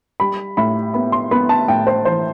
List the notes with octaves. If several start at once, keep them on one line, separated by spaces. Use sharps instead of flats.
G3 B5
A2 B5
B3 B5
C6
B3 B5
A5
A2 G5
C5
E3 C5